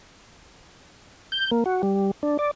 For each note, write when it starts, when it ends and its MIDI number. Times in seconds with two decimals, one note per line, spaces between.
1.32 1.51 91
1.51 1.64 58
1.66 1.82 66
1.83 2.11 55
2.23 2.37 62
2.39 2.51 74